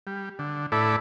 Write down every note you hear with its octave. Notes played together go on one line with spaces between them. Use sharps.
G3
D3
A2 E4 A4 D5 B5